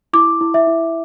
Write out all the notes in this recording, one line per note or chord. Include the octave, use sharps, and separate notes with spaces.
E4 D6
E4
E5
E4